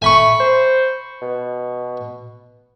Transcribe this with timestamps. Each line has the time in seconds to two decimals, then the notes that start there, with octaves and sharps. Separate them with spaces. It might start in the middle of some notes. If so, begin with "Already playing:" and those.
0.02 A3 G#5 B5 C#6
0.40 C5
1.21 B2